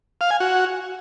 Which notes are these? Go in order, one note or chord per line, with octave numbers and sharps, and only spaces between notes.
F5
G#5
F#4